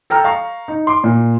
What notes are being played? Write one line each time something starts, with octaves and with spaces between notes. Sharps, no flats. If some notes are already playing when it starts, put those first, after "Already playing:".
A4 G5 A#5 F6
F5 A#5 C#6
D#4
C6 D6
A#2